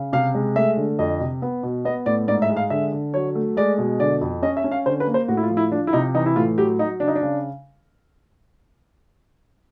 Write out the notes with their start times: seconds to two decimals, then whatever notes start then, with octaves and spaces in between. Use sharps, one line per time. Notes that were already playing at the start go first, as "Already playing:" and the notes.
Already playing: C#3
0.13 C3 F5
0.35 G#3
0.56 A3 E5
0.77 D3
0.99 F2 D#5
1.20 C3
1.42 B3
1.63 B2
1.85 B3 D#5
2.06 A2 D5
2.28 G#2 D5
2.42 E5
2.49 G#3
2.56 F5
2.70 D3 E5
2.92 D3
3.14 F#3 C#5
3.35 A3
3.57 G#3 D5
3.78 B2
4.00 D3 D5
4.21 F2
4.42 C#4 D#5
4.57 E5
4.64 C#4
4.71 F5
4.86 D3 C5
5.00 B4
5.07 A#3
5.14 C5
5.28 A2 F#4
5.37 E4
5.43 F4
5.50 F3
5.57 E4
5.71 F3 D4
5.87 E4
5.93 C3 D#4
6.15 E3 D#4
6.26 E4
6.36 A2 F4
6.58 F#3 G4
6.79 F#3 D#4
7.00 C#3 D4
7.08 D#4
7.15 D4
7.22 C#3